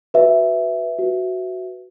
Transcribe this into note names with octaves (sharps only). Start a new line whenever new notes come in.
F#4 B4 E5
F#4 B4